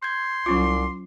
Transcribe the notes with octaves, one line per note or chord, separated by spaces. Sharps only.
C6 G6 G#6
C2 F#3 C#4 F4 D6